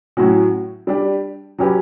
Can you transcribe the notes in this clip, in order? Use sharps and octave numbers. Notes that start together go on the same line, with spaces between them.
A2 F#3 C#4 F#4
G3 D4 G4
F#3 C#4 G4 B4